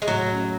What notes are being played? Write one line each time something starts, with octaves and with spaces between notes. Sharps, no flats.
G#3
A2 F#3
C#4